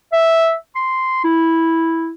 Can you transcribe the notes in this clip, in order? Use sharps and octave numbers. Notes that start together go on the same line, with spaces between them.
E5
C6
E4